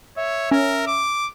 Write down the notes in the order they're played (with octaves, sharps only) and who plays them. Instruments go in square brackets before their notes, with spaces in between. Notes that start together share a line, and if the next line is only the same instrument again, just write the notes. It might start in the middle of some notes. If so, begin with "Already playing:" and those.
[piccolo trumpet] C#5 [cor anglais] E5
[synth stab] C#4 [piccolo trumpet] A#4
[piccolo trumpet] D6